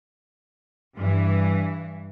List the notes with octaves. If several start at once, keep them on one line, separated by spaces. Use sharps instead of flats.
G2 E3